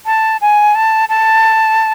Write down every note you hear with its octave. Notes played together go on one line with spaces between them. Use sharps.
A5
G#5
A5
A5